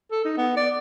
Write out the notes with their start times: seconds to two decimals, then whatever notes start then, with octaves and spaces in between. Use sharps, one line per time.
0.11 A4
0.25 D#4
0.37 B3
0.57 D5